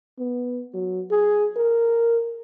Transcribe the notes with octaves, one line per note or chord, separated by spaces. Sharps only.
B3
F#3
G#4
A#4